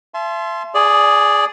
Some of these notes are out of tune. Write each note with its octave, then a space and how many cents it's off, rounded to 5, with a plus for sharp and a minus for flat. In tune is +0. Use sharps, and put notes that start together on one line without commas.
E5 +40 A5 -35 C6 +0
G#4 +0 D5 +0 G#5 +45